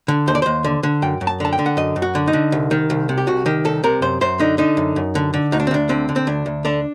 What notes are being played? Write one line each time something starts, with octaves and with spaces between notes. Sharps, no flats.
D3
D#2 C5
D5
D#2 C5
D3
D3
F#2 G5
F#2
A5
D3 A5
G5
D3
F#5
F#2 D#5
F#2
F#4
D3
D#4
D3
C2
D#3
C2
C3
G4
C2 F#4
D#3 G4
C2 A4
C3 A#4
F#2 C5
F#2 C5
D3 D#4
D3 D#4
F#2
F#2
D3
D3
D2 D#4
D4
C4
D2 D4
D3 C4
D3
C4
D2 D4
D2
D3 D4